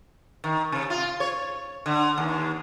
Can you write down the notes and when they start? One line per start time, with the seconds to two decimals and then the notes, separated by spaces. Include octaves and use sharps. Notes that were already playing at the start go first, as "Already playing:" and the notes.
0.44 D#3
0.72 C3
0.90 F4
1.20 C#5
1.86 D3
2.18 D#2